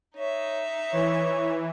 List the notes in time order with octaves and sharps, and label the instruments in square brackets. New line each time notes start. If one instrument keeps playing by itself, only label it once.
[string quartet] D#4 E5 [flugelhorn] C#5
[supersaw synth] E3 [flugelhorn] C#5